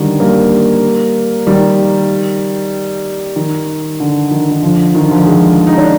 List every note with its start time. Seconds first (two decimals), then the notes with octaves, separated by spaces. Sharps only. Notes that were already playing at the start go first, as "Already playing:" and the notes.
Already playing: D3 D#3 G3
0.20 G3 A#3
1.47 D#3 G3
3.36 D#3
4.00 D3
4.31 D#3
4.51 D#3
4.62 D3 F3
4.95 D#3
5.11 D3 F3
5.26 F3 G#3
5.67 D#4
5.78 D4